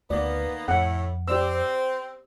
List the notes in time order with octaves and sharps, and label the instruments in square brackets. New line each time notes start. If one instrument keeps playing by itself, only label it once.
[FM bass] D2 [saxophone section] D#3 A#3 B3 [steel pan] D5
[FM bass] F2 [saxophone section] A2 [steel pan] F#5
[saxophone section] C4 [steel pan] G4 D5 E6